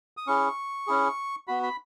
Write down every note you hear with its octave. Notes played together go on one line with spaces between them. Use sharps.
D#6
C#4 E4 G#4 C#6
C#4 E4 G#4
B3 F#4 B5
B5